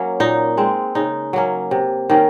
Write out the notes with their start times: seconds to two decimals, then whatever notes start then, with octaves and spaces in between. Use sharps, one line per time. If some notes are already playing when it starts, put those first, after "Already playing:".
Already playing: F#3 A#3 C#4
0.20 A#2 D#4
0.57 G#3 C4
0.95 C#3 D#4
1.33 F#3 A#3 C#4
1.71 C3
2.10 D#3 A#3 C#4